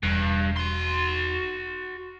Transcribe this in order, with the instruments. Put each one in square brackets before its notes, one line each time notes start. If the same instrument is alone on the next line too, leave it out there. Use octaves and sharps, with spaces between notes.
[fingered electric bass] E1 [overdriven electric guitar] G2
[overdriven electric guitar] F#4 C6